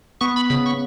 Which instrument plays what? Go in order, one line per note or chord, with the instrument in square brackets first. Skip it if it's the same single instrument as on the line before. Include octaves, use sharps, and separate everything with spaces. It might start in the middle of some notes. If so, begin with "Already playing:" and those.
[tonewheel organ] B3 C#6
B5
C#3 B5
C#6